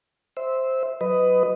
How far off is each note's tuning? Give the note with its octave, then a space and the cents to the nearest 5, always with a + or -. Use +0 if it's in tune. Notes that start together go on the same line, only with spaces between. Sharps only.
C5 +0 E5 -15
F#3 +0 B4 +20 D#5 +0